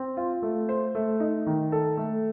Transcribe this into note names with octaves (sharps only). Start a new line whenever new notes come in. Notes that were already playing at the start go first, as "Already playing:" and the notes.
Already playing: C4
F4
A3
C5
A3
D#4
D#3
A4
A3